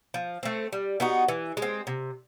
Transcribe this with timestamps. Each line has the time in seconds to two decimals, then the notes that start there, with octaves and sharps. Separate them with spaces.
0.14 F3
0.43 A3 C4
0.73 G3
1.00 B3 D#4 F#4
1.28 E3
1.57 G#3
1.62 C4
1.87 C3